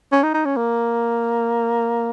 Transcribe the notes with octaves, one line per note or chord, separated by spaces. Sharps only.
C#4
D#4
D#4
C#4
A#3